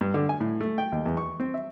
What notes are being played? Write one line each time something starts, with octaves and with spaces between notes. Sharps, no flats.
G2
D3
G#5
A2
A3
G5
D#2
E2
C#6
C4
E5